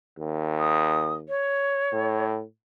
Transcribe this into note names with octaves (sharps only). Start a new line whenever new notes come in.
D#2
D#6
C#5
A2